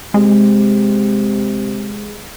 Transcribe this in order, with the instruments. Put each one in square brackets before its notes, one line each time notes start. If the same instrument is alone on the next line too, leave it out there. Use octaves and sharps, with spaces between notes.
[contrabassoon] C3 [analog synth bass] G#3